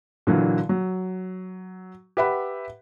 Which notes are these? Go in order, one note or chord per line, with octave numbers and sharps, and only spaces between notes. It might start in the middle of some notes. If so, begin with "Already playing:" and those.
A#2 D3 E3 F#3
F#3
G4 B4 E5 F#5 B5